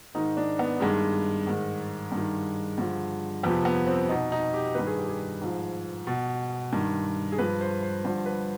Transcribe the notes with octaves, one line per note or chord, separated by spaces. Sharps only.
G#2 D#3 D#4
D4
B3
G2 D#3 G#3
G#2 D#3
G2 D#3
G2 D3 F3
F2 C3 F3 B3
B3
C4
B2 D#4
D#4
G4
G2 D#3 B4
G#4
G4
G#4
G#2 F3
B2
G2 D#3
G#4
G2 F3 B4
C5
C5
G2 D3 F3 C5
B4